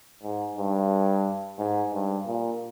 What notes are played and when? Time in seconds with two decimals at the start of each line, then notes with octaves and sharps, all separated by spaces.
0.24 G#2
0.58 G2
1.59 G#2
1.94 G2
2.27 A#2